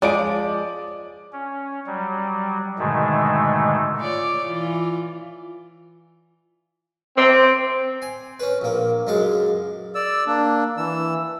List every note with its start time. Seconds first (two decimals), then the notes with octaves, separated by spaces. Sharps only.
0.02 F3 G#3 D5 D7
1.32 C#4
1.86 F#3 G3
2.79 G#2 B2 D3 D#3 G#3 A3
3.98 F4 C#5 D5
4.44 E3 F4
7.17 C4
8.02 G#5
8.40 C#4 B4
8.62 A#1 A#3
9.07 C#2 F#2 G#3 F5
9.95 D5 E6
10.27 A#3 D4
10.77 E3 E6